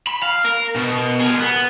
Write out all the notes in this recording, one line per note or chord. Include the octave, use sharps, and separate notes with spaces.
B5
F5
A#4
B2
G#4 A#4
B3